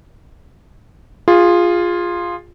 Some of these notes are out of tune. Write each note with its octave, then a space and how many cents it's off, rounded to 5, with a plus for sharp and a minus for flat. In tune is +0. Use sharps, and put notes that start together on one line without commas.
F4 +0 G#4 -20